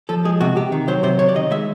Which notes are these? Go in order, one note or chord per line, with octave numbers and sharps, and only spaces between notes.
F3 A4
G#3 G#4
C3 F#4
C3 G4
D#3
F#3 C5
C3 C5
C3 C#5
D5
D#3 D#5
G#3 E5